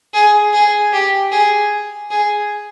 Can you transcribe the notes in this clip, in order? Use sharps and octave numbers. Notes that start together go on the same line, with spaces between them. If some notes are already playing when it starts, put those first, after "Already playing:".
G#4
G#4
G4
G#4
G#4